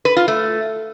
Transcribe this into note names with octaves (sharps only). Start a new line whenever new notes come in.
B4
F4
A3